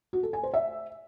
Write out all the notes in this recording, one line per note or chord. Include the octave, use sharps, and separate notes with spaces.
F#4
A4
G#5
C5
E5